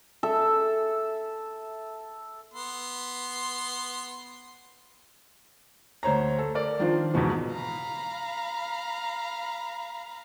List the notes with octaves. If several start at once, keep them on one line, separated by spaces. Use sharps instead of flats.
A4 E5
B3 C6
D2 C5 C#5 A#5
A4
A#4 D5
D#3 F3 D4 F4 C5
E2 G#2 B2 E3
F5 A#5 B5